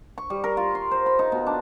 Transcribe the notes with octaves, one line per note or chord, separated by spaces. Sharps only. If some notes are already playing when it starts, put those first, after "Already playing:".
C#6
G3
A#4
F4
C6
C5
B5
D#4
B2
D4